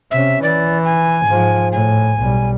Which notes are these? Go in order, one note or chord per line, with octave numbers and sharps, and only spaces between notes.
C3 C#4 E5
E3 D5
G#5
G#2 F3
A2 G#5
B1 G3